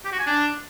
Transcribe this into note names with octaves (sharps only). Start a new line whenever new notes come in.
G4
F#4
G#5
D4